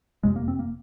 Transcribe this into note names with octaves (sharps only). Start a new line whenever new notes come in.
F#1 F2 C3 G#3
A#3
C4
A#3